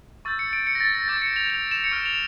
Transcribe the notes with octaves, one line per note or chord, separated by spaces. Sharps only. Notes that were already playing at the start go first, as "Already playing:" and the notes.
C#6 E6 G6 A6
C#7
D7
C#7
A#6
A6
A#6
D6 G6 A6
C#7
F7
F7
E7
C#7
C#6 F6 D7
F7